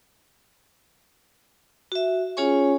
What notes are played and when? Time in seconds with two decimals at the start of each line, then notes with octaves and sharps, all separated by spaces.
1.92 F#4 E5
2.37 C#4 F4 G#4 C#5 G#5 C#6